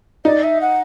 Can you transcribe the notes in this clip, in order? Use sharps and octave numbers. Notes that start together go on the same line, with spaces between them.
D#4 D5
E5
F#5